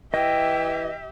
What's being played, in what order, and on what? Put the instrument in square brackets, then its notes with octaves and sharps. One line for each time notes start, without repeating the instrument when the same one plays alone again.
[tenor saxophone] E3 [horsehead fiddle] G4 E5 [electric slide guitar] D#5 [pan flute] G5